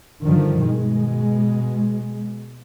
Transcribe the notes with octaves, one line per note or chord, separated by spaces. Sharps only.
G2 D3 D#3 F3
B2 G#3